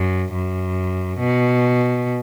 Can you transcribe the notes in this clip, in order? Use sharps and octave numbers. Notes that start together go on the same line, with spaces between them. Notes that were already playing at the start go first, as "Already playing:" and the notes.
Already playing: F#2
F#2
B2